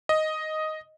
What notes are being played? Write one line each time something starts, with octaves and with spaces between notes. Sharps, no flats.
D#5